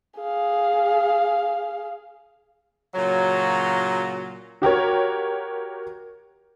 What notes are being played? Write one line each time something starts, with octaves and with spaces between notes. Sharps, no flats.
G#4 F5
A#2 C#3 F#3
F#4 G4 A#4 C#5